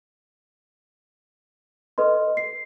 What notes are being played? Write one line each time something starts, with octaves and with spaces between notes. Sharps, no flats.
A4 B4 D#5 C6
C7